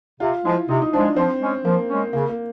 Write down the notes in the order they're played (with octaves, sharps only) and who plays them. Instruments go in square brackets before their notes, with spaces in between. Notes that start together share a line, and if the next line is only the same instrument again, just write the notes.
[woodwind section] C3 [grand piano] F4
[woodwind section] F3 G#3 [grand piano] E4
[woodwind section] C3 [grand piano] D#4
[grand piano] D#4
[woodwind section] F3 G#3 [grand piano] D4
[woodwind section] F3 [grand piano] C4
[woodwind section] G#3 C#4
[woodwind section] F3 [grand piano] A#3
[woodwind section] G#3 C#4
[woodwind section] C#3 [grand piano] A#3
[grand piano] A#3